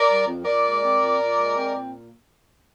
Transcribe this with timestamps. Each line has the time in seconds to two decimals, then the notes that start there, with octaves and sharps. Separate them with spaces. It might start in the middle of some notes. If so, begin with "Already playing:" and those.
Already playing: A#4 D5
0.09 G3
0.27 F2
0.45 A#2 A#4 D5
0.64 G#3
0.82 C4
1.00 A#2
1.19 A#2
1.37 G#3
1.55 C4
1.74 A#2